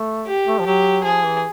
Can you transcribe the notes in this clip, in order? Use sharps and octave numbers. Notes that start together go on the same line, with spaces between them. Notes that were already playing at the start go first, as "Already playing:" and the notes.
Already playing: A3
G4
A3
F3
F#3 G4
F3 G#4
E3